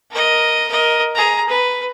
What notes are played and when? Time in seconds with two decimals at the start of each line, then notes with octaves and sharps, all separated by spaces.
0.11 A#4 D#5
0.68 A#4 D#5
1.15 G#4 A#5
1.49 B4